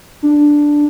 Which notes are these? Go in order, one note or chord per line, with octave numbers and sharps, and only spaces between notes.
D4